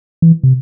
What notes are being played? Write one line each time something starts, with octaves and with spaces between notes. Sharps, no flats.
E3
C3